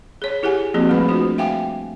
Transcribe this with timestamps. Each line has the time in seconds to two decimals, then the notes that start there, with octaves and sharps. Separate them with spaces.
0.22 G#4 C#5
0.43 E4 G4 G#4 F#5 G#5
0.74 F3 A#3 C4 F#4 G#4
0.89 G3 A3 B4 B5
1.08 D4 F4 F#4 C5
1.38 E5 F5 G5 G#5 D6